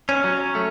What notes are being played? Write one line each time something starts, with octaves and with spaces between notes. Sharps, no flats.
C#4
F#3
A3